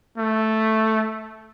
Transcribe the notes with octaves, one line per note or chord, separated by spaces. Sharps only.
A3